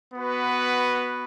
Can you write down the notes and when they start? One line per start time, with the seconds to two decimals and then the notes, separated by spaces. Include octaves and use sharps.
0.13 B3 F#4 B4